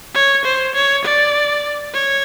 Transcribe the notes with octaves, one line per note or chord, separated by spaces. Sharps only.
C#5
C5
C#5
D5
C#5